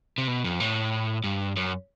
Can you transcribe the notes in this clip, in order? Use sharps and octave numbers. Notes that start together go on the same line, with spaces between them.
C3
B2
F2
A2
G2
F#2